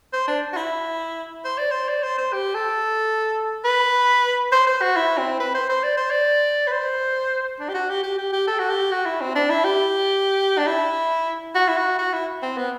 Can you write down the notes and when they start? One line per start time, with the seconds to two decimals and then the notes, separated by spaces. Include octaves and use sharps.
0.13 C5
0.28 D4
0.53 F#4
0.57 E4
1.45 C5
1.58 D5
1.71 C5
1.89 D5
2.03 C5
2.18 C5
2.33 G4
2.54 A4
3.64 B4
4.52 C5
4.67 C5
4.82 F#4
4.96 E4
5.18 C4
5.40 B4
5.55 C5
5.69 C5
5.84 D5
5.97 C5
6.11 D5
6.68 B4
6.72 C5
7.60 D4
7.69 G4
7.74 F#4
7.89 G4
8.03 G4
8.18 G4
8.33 G4
8.47 A4
8.59 F#4
8.69 G4
8.91 F#4
9.06 E4
9.21 C4
9.35 D4
9.50 E4
9.65 G4
10.58 D4
10.67 E4
11.55 F#4
11.69 E4
11.77 F#4
11.99 F#4
12.13 E4
12.43 C4
12.57 B3